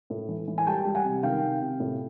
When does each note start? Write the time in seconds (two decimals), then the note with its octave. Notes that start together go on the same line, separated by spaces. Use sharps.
0.10 A2
0.29 E3
0.48 E3
0.58 G#5
0.67 G3 G5 A5
0.85 G3
0.95 F#5 G#5
1.04 C3
1.23 D#3 F5 G5
1.42 C3
1.61 C3
1.80 A2